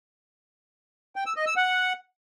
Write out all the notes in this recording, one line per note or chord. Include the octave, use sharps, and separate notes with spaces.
G5
E6
D#5
E6
F#5